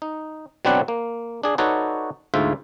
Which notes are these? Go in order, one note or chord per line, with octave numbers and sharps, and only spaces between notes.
D#4
B2 F#3 C4 D4 B4 F#5
A#3
D4 G#4
D#4 F#4 A4 B4 C#5 D5
D2 G#2 F4 E5